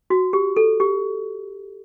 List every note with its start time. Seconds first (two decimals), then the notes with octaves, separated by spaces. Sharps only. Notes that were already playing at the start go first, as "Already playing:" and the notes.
0.10 F#4
0.33 G4
0.57 A4
0.80 G4